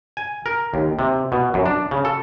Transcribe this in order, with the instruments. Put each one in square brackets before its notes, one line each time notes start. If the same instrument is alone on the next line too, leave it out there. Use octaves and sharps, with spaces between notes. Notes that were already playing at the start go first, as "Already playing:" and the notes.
[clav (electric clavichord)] G#5
A#4
D#2
C3
B2
F#2
D4
C#3
A4